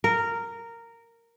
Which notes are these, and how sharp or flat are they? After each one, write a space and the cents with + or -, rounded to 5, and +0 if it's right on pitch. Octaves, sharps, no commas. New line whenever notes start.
A#4 -10